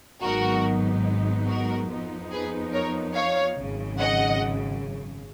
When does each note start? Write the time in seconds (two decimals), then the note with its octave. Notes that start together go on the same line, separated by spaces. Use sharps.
0.23 G#1 G#2 F#3 B3 D#4 F#4 A#4
1.48 F#4 A#4
1.90 F2 F3 B3 D#4
2.31 G#4 B4
2.73 A#4 C#5
3.15 C#5 F5
3.57 G#1 F#2 C#3
3.98 D#5 F#5